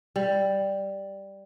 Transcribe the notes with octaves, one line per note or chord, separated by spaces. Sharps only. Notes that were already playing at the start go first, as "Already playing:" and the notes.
G3